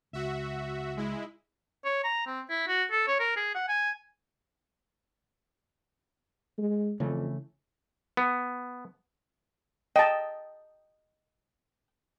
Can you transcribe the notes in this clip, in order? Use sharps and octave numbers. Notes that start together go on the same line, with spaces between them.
C#2 F#4 E5
G#3 E4
C#5
A#5
C4
E4
F#4
A4
C#5
A#4
G#4
F#5
G#5
G#3
F2 C#3 E3 A3
B3
D#5 G5 A5